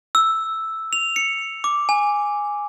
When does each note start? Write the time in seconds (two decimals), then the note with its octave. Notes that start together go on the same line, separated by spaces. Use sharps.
0.15 E6
0.93 F7
1.16 C#7
1.64 D6
1.89 G#5